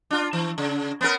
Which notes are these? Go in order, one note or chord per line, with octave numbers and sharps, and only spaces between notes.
D4 F4
E3
C#3
B3 C#4 A#4